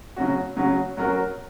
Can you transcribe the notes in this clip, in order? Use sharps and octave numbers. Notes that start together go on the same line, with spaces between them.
C#3 F#3 C#4 F#4
C#3 F#3 C#4 F#4
F#3 C#4 F#4 A#4